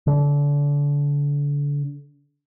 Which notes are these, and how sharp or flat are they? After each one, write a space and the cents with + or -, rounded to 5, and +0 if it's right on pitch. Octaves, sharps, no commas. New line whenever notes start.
D3 -30